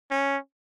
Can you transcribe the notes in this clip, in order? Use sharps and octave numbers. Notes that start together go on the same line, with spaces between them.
C#4